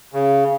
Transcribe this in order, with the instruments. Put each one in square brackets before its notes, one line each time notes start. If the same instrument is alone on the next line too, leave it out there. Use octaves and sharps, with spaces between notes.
[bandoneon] C#3